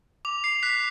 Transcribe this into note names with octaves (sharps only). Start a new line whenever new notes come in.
D6 F7
C7
F#6 B6